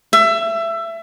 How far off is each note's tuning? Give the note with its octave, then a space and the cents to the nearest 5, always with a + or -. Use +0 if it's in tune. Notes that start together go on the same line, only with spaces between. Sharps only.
E5 +20